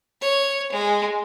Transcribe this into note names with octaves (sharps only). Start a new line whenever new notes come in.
C#5
G#3